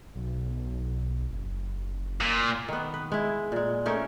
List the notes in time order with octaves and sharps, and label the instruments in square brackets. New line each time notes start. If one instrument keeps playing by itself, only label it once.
[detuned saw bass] B1
F#1
[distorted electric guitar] A#2
[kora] D#3 B3
B4
G#3 E4
A#2 G#3
A3 C#4 D#4 A#4